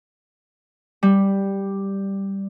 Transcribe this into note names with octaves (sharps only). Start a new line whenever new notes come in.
G3